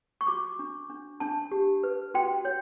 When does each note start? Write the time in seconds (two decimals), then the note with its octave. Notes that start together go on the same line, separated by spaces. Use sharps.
0.21 C#6
0.27 F#4 D6
0.59 D4
0.90 D4
1.20 D4 A5
1.52 G4
1.83 B4
2.14 F#4 G5
2.45 C#5